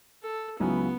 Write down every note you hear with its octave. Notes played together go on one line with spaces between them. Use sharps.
A4
C#2 C#3 F#3 B3 C#4 E4